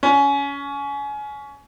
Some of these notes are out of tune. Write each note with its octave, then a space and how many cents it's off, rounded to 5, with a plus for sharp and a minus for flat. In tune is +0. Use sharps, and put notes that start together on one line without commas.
C#4 +25